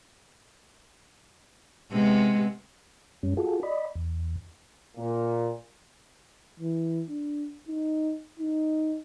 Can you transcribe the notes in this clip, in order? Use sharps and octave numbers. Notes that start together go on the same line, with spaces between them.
C3 G#3 B3
F#2 G3 C#4
F4 F#4 G#4 A4
D5 D#5 B5
E2
A#2
E3
D4
D#4
D#4